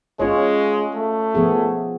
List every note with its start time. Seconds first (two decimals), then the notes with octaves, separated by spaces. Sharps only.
0.20 G#3 C#4 F4 C#5
0.94 A3
1.35 F3 B3 G#4